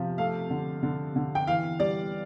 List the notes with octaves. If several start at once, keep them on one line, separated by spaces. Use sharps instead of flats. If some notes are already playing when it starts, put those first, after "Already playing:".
Already playing: C3 F3
A3 F5
D3
D3
D3
G5
E3 F5
G3 D5